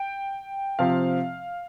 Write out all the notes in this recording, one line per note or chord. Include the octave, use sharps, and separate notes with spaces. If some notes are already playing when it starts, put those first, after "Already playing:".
Already playing: G5
C3 F3 C4 F5